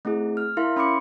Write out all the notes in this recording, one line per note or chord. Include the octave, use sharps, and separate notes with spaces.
A3 C4 E4 G#4
F6
E4 A#4 E5 F5 C6
C#4 B5 C6 D6 C#7